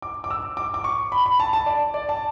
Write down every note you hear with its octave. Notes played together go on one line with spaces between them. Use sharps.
D6
D6
E6
D6
D6
C#6
B5
B5
A5
A5
D5
D5
A5